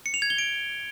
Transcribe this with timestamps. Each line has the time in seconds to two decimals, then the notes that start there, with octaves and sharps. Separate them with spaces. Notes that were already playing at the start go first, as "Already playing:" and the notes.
0.06 C#7
0.14 F7
0.22 G#6
0.30 G7
0.38 D7